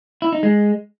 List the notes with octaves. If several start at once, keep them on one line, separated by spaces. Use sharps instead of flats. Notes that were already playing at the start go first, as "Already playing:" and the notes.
E4
D#4
G#3